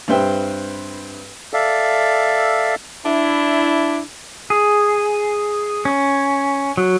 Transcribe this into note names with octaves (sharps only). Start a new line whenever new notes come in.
G2 C4 B4 C5 E5 G5
A4 D5 E5 F5
D4 E4
G#4
C#4
F#3